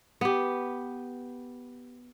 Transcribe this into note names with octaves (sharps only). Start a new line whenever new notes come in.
B3 G4